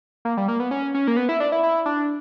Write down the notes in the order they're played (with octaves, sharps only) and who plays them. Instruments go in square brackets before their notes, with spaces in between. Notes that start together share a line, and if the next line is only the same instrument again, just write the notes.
[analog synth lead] A#3
G3
A#3
B3
C#4
C#4
A#3
B3
E4
D4
E4
E4
D4